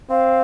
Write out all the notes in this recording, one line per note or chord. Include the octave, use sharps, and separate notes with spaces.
C4 F5